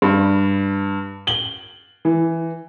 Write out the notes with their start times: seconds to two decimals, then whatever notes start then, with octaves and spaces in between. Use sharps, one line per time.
0.02 G2
1.27 F#7 G7
2.05 E3